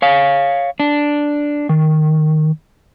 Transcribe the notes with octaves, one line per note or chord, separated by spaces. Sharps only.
C#5 F5
D4
D#3